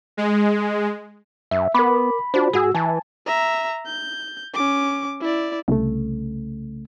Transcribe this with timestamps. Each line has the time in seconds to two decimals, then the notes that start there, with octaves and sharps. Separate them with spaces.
0.17 G#3
1.51 F#2 E5
1.74 B3 A#4 B5 D6
2.34 D4 F4 F#4 C5
2.53 G#2 F#4 G#4 E6
2.75 E3 G#5 A5
3.26 E5 A#5
3.86 G6
4.54 C#4 D6
5.21 E4 D5
5.68 C2 C#3 A3